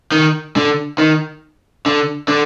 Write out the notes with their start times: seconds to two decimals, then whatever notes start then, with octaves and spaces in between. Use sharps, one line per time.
0.12 D#3
0.56 D3
0.98 D#3
1.86 D3
2.28 D3